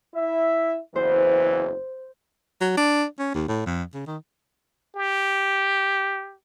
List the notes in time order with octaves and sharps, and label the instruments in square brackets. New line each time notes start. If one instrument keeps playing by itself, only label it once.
[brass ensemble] E4 E5
[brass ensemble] F#1 E2 E3 [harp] C5
[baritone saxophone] F#3
D4
C#4
D#2
A2
F2
C#3
D#3
[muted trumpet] G4